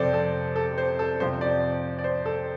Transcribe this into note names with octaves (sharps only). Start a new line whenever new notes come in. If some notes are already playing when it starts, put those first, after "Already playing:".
Already playing: F2 C3 F3 A4 C5 D5
A4
A4
C5
A4
F2 C3 F3 C5
D5
D5
C5
A4